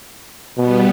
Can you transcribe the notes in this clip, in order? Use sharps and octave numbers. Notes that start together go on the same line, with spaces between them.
B2 G3 B3